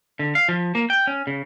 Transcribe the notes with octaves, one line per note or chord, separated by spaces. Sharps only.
D3
F5
F3
A#3
G5
C#4
C#3